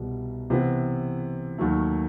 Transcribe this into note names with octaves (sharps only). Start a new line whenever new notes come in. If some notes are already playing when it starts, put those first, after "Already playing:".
Already playing: C2 B2 G3
C3 E3 B3
D#2 D#3 F#3 A3